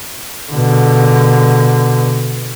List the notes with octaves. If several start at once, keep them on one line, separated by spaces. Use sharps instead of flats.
B2 D3